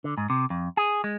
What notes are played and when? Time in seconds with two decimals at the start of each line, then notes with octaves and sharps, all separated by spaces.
0.04 D3
0.17 G#2
0.30 C3
0.50 F2
0.77 G#4
1.04 G#3